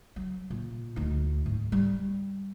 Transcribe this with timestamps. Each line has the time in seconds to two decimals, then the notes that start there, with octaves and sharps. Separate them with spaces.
0.16 F#3
0.50 A#2
0.96 D2 D#4
1.46 G#2
1.72 G3